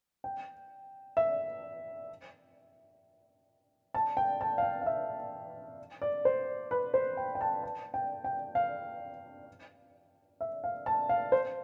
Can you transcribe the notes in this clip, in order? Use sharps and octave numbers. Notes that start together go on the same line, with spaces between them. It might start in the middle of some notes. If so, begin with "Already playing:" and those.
G5
E5
A5
G5
A5
F5
G5
F5
E5
D5
C5
B4
C5
G5
G5
A5
A5
G5
G5
F5
E5
F5
A5
F5
C5